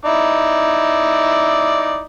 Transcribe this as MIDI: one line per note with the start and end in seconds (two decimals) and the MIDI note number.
0.05 2.03 63
0.05 2.03 64
0.05 2.03 74